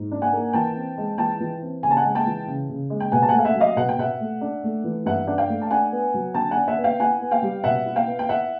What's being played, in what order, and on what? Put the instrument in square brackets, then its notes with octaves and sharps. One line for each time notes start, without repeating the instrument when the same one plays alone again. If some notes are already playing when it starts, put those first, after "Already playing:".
Already playing: [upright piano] G#2
D4
F#5 G#5
A#3
E3 G5 A5
C4
G#3
E3 G5 A5
E3
C4
C#3 G#5
A5
F#5 G#5
G#3
G5 A5
E3
C#3
C#3
G#3
G5
B2 F#5 G#5
A5
A3 F#5 G#5
F5
E5 F#5
F#3
D#5 F5
B2 F#5
G5
B2 E5 F#5
A3
D4
A3
E3
G2 E5 F#5
D4 F#5
F5 G5
A3
A5
D4 F#5 G#5
B3
F#3
D3 G5 A5
D4 F#5 G#5
E5 F#5
B3
F5 G5
E4 F#5 G#5
B3
F5 G5
G3
B2 E5 F#5
E4
F5 G5
B3
G5
E4 E5 F#5